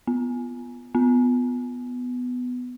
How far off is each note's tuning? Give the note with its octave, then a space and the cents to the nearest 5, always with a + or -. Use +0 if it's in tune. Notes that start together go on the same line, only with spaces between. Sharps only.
B3 -5
B3 +10